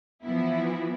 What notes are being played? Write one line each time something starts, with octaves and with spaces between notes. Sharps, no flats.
E3 F3 B3 E4